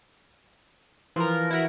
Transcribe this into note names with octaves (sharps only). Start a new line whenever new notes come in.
E3 F3 F4 A#4
E4 F#4 A#4